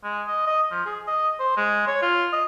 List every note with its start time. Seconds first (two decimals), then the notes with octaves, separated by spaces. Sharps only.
0.04 G#3
0.27 D#5
0.47 D#5
0.71 F3
0.86 G#4
1.07 D#5
1.40 C5
1.57 G#3
1.87 C#5
2.02 F4
2.33 D#5